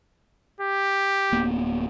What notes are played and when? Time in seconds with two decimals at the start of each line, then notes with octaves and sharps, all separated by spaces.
0.61 G4
1.32 D1 A#3 B3